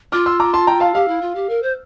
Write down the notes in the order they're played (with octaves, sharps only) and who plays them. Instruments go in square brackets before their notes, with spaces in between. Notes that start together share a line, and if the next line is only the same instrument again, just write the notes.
[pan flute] F4 [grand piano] D6 F6
[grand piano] C6 E6
A#5 D6
A5 C6
G5 A#5
F5 A5
[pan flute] G4 [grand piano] F5
[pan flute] E4
F4
G4
A#4
C5